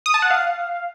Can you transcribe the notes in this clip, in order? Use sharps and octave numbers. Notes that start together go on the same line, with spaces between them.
D#6
A5
F#5
F5